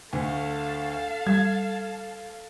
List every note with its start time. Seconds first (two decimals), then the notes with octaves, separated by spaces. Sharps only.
0.13 D2 A4 F5
1.27 G3 G#6